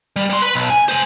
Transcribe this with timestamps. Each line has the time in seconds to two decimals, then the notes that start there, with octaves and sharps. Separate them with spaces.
0.16 G3
0.30 G3 C6
0.42 B4 B5
0.55 B1
0.70 G#5
0.89 C5 G#5